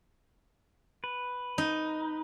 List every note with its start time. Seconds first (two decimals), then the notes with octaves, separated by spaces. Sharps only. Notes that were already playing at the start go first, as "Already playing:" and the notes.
1.04 B4
1.58 D#4